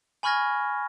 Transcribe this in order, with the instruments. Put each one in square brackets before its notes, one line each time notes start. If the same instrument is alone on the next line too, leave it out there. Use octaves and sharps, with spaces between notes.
[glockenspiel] G#5 B5 C#6 F6 G#6 A#6